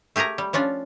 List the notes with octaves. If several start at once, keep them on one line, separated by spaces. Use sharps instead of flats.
A3 G4 G#4 A#4 A#5
G3
F3 C#4 D4 F4